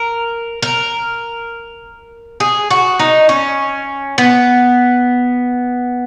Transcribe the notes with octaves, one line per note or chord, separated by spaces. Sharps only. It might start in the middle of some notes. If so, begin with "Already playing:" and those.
Already playing: A#4
A#4
G#4
F#4
D#4
C#4
B3